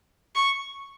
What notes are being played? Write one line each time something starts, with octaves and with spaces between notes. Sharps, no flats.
C#6